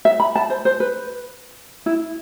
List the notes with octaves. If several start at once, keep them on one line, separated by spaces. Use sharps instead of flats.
E5
B5
A5
C5
C5
B4
E4